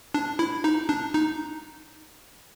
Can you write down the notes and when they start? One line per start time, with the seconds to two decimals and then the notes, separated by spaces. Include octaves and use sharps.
0.14 D4
0.39 E4
0.64 D#4
0.89 D4
1.14 D#4